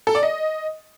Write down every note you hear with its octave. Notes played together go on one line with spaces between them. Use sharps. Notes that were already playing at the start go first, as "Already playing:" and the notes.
A4
D5
D#5